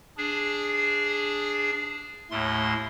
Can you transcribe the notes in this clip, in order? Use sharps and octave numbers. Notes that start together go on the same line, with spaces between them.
D4 G#4
D#2 A2 A3 C6